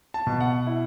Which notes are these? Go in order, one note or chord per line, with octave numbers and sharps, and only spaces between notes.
A5
B2
F#5
E4